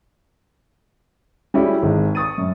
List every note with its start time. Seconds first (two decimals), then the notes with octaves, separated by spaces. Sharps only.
1.54 G3 C#4 E4 F#4 G#4
1.82 G#1 G#3
2.15 C#6 D#6 A6 D#7
2.38 F#2